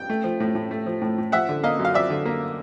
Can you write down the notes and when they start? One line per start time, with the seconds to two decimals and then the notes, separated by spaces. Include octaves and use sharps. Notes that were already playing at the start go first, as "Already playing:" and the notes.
Already playing: G5
0.10 A3
0.24 F3
0.40 A2
0.55 A2
0.71 A3
0.86 F3
1.02 A2
1.18 A2
1.32 F3 E5 F#5
1.49 D3
1.63 A#3 D#5 F5
1.79 F#2
1.85 F5
1.94 F3 D5 E5
2.10 D3
2.25 A#3